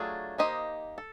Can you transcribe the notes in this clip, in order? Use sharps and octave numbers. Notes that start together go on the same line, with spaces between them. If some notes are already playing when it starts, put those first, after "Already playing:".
Already playing: F#3 A3 D4 F4 G#4
A#3 D#4 G4 C5 D#5
A4